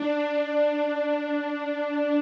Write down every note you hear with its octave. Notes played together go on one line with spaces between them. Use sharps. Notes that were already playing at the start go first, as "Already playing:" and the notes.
Already playing: D4